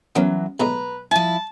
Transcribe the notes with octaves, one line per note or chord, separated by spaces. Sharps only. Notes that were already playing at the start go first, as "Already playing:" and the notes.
E3 F#3 B3 C#4 A#4
B1 A2 G#3 B4 A#5
F3 E4 A5